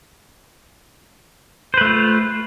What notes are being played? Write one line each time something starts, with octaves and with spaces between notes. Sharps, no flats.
A3 F4 B4 C5